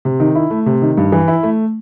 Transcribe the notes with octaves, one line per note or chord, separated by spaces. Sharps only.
C3
D#3
E4
A3
C3
D#3
G2
E3
E4
A3